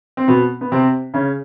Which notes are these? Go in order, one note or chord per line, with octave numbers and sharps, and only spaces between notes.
C4
B2 B3
B3
C3 C4
C#3 C#4